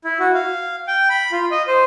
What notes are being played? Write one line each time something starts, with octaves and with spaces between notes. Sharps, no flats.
E4
F#4
F5
G5
B5
F4
D#5
C5